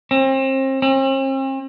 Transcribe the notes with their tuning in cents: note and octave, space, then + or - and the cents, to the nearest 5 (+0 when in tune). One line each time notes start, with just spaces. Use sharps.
C4 +35
C4 +45